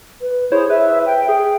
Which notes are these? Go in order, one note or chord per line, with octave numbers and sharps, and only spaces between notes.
B4
E4 G#4 C5 C#5
B4 E5
G5
G#4